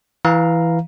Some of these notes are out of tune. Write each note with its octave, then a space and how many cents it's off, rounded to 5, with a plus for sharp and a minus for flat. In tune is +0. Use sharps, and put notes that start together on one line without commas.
E3 +0 F5 +0 A#5 +0